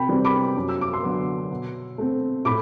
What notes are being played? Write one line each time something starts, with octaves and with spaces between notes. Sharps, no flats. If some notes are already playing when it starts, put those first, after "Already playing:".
Already playing: C3 G5 B5
E3 G3 C4
B5 D6
F#2
E6
D6
C6 E6
D3 F#3 B3
B2
A3 C4
A2 B5 D6